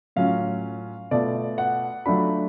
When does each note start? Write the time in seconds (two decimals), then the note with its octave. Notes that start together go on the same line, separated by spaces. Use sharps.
0.16 A2 F#3 C#4 F4 F5
1.11 B2 A3 F4 D5
1.58 F#5
2.05 F#3 A3 D4 F4 B5